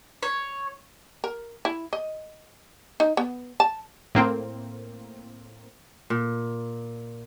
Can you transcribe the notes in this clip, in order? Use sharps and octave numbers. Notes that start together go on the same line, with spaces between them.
C#5
A#4
E4
D#5
D#4
B3
A5
A2 A#3 C4
A#2